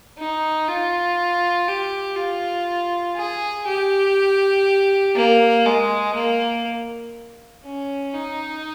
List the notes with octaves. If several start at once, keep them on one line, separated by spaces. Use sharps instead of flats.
D#4
F4
G4
F4
G#4
G4
A#3
G#3
A#3
C#4
D#4